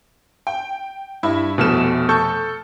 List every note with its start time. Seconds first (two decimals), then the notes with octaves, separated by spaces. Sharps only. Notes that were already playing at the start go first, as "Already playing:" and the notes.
0.47 G5
1.23 G2 E4
1.58 F1 B2 A3 F6 E7
2.09 A4 C#6 G6